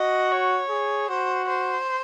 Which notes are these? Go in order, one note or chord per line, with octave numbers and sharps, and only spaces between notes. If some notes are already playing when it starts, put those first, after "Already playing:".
Already playing: F#4 D#5
C#5
G#4
F#4 C5
C5